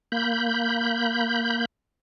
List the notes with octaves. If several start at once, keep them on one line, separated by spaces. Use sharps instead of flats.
A#3 B5 G6